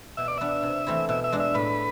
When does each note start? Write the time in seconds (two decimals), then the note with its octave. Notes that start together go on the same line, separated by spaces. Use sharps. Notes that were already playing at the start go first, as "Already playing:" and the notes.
0.17 B2 E5
0.28 D5
0.38 B3 D4 E5
0.63 C3
0.87 E3 A3 C4 E4
1.09 B2 E5
1.24 E5
1.32 G#3 D4
1.40 E5
1.55 A2 B4